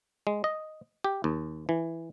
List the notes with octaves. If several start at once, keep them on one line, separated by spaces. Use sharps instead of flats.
G#3
D#5
G4
D#2
E3